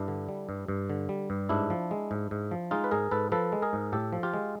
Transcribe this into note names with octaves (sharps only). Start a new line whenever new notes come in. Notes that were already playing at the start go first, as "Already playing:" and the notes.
Already playing: G2 D4 E4
D3
G3
G2
G2
D3
G3
G2
G#2 D4 E4
F3
G#3
G#2
G#2
F3
G#3 D#4 F4
B4
G#2 G#4 A#4
G#2 A4 B4
F3 A4 B4
G#3
G#4 A#4
G#2
A2 G4 A4
F3
F4 G4
G#3